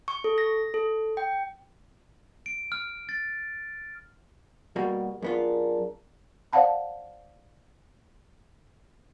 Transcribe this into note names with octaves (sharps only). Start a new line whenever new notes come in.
C#6
A4
A#6
A4
G5
D7
F6
A6
B2 G3 A#3 F#4
F#2 B3 D4 F4 G#4 A#4
C5 D5 F5 F#5 A5 B5